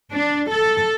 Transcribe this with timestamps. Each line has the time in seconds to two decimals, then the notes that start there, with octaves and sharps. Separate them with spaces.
0.12 D4
0.51 A4